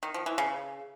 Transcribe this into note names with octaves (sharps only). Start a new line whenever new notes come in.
D#3
F3
E3
C#3